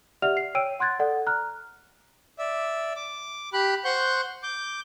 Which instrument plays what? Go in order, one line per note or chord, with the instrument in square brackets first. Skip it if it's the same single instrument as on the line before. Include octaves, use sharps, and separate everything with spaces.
[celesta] G4 D5 E5 F#5 F6 F7
C7
C#5 G5 E6 D7 D#7
F#5 C6 F#6 G#6 A6
A4 D5 F#5
A#5 F6 F#6
[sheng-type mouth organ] D5 E5
D6
G4 B5 F#6
C5 F#5 C6 C#6 F#6 G6
D6 G6